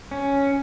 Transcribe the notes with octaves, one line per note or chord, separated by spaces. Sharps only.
C#4